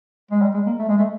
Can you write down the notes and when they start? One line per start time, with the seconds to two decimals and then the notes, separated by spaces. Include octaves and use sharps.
0.31 G#3
0.42 G3
0.54 G#3
0.67 A#3
0.79 A3
0.89 G#3
0.98 A3